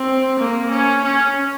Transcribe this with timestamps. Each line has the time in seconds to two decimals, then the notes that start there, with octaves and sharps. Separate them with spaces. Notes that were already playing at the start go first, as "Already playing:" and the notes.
Already playing: C4
0.39 A#3
0.70 C#4
1.04 C#4